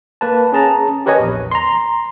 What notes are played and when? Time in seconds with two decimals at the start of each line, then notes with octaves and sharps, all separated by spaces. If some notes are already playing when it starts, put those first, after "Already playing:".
0.21 A#3 B4 A5
0.52 C#4 G#4 A5 A#5
1.06 G4 A#4 B4 C#5 D#5 G#5
1.20 A#1 E2
1.51 A#5 C6